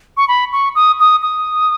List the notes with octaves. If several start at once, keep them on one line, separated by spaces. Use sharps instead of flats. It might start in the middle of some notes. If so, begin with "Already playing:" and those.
C#6
B5
C#6
D#6
D#6
D#6